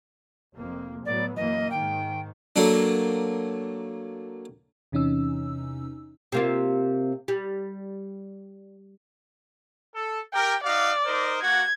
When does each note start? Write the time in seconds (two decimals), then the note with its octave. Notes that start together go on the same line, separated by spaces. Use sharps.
0.55 F1 F2 A#3
1.05 A2 F#3 B3 D5
1.36 F#2 E3 A#3 D#5
1.70 G#2 D#3 G5
2.56 F#3 A3 A#3 D4
4.92 E2 C3 E3 C#4 D#4 E6
6.32 C3 A#3 F4
7.28 G3
9.93 A4
10.33 G4 A#4 G5
10.64 D#4 F#4 D5 F5
11.05 D#4 A#4 C5
11.42 A#3 F#4 G#6